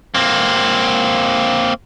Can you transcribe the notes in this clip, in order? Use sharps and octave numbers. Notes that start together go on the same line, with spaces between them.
A#3 C4